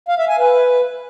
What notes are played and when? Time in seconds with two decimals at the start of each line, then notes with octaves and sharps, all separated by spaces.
0.08 F5
0.18 E5
0.29 G#5
0.39 B4